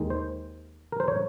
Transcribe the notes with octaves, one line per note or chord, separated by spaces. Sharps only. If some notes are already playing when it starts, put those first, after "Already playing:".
Already playing: D#2 D#3 G#3
C5
A#4
C5
C#5